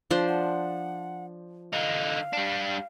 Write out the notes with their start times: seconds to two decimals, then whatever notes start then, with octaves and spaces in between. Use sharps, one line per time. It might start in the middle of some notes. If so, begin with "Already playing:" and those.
0.10 F3 D4 C5
0.28 F#5
1.73 D3 D#4 F5
2.33 G3 D4